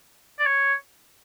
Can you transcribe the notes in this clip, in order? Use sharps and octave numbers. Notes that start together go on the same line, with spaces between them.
D5
C#5